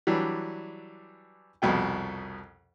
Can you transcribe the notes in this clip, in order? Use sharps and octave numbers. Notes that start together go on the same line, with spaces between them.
E3 F#3 G3 D4
C2 F2 B2 G5